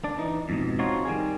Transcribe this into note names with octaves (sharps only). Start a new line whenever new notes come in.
D4
E3 D#4
F2 G#2 B2
C4 D4 D#4 F4 F#4 C#5
D#3 G3 G#4